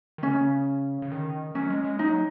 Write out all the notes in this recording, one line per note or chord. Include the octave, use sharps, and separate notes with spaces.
D#3
C#3 C#4
C#3
D#3
F#3 C#4
G#3
G#3
F#3 D#4